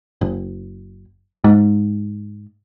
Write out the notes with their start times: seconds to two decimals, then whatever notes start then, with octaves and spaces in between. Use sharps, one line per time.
0.21 F#1
1.44 G#2